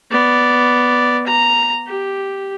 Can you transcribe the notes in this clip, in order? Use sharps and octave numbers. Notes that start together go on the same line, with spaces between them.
B3 D5
A#5
G4